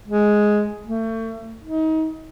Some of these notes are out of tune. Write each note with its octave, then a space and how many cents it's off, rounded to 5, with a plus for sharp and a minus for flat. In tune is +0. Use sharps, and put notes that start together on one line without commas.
G#3 +5
A3 +35
D#4 +30